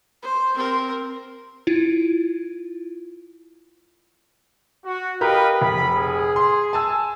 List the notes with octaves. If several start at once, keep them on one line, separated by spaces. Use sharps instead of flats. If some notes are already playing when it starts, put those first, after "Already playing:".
C5
C4 A#4
E4 F4
F#4
G4 A#4 B4 D#5 F5 B5
F1 B5
G#4
C6
G#5 A5 E6